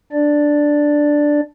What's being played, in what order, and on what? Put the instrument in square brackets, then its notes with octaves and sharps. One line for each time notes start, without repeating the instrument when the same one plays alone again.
[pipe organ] D4 D5